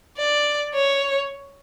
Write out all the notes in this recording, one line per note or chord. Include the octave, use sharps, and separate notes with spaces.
D5
C#5